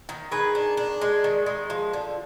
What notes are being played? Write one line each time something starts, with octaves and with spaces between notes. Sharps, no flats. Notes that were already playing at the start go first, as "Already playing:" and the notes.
D#3
D#3 G#4 B4
D4
D4
G#3
D#3
G#3
F3
D3